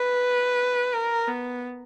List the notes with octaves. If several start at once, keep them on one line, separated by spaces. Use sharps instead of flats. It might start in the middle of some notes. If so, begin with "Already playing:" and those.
Already playing: B4
A#4
B3